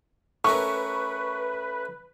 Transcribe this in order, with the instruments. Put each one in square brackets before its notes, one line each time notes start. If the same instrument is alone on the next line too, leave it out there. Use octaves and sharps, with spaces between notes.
[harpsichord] A3 C#4 A#4 [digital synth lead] B4 [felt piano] C#6